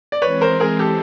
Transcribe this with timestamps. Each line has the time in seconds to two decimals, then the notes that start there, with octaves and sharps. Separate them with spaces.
0.12 D5
0.22 E3 G#3 C4 B4 C#5
0.41 A#4 C5
0.60 G#4 A#4
0.79 G4 A4